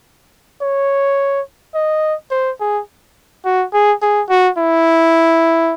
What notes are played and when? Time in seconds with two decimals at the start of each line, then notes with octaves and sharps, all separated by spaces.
0.62 C#5
1.75 D#5
2.31 C5
2.60 G#4
3.45 F#4
3.73 G#4
4.02 G#4
4.30 F#4
4.58 E4